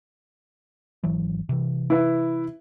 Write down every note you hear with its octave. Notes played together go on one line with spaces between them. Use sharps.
G#1 E3 F#3
C3 E3
E4 B4 E5